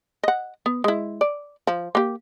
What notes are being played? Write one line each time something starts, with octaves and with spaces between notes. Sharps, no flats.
D#5 F#5
B3
G#3 E4
D5
F3
A#3 G4